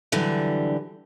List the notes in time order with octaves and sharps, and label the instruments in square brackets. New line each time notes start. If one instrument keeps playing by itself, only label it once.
[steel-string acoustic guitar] D3 E3 F#3 G3